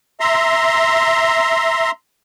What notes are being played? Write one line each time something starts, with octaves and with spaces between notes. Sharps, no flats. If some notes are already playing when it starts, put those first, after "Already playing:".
E5 A#5 C6